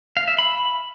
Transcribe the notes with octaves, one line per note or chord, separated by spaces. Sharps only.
F5
E5
B5